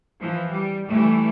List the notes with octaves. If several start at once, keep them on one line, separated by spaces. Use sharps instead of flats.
E3 F3
G3
E3 G3 A3